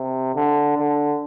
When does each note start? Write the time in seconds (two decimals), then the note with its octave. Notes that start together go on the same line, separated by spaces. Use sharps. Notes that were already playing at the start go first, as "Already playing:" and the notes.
Already playing: C3
0.35 D3
0.77 D3